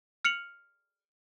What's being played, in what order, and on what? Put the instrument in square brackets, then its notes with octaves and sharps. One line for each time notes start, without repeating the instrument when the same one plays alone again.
[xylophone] F6 C#7 F7 F#7